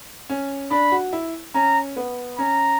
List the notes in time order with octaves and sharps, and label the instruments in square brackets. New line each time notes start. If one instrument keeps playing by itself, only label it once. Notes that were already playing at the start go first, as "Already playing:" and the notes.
[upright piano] C#4
[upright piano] D4 [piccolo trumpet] B5
[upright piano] F#4
E4
[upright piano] C#4 [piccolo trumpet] A#5
[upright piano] B3
[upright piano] C#4 [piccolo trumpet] A#5